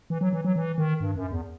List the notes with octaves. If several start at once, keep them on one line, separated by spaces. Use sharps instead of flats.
E3
F#3
E3
F#3
E3
D#3
G2
F#2
E2